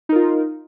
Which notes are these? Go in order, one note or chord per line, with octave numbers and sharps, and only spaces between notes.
D#4 F4 A#4